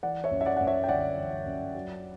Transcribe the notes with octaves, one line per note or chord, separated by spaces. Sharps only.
E3 D5 F#5
C#5 E5
F#2
E5
D5 F#5
F#2 F#5
C#5 E5
G5
G1 D5 F#5
E3
F#2
F#3